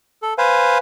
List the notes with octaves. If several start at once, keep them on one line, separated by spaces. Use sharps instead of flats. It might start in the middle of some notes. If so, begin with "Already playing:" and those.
A4
B4 C5 F5 G#5